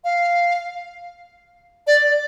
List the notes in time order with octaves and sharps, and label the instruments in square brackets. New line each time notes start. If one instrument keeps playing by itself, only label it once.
[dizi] F5
D5